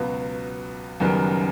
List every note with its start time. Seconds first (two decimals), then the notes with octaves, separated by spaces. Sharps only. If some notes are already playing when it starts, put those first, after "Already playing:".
Already playing: C#2 B2 F#3 B3
1.00 F#1 F#2 D#3 G3 B3